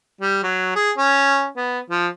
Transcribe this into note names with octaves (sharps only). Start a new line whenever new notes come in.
G3
F#3
G#4
C#4
B3
F3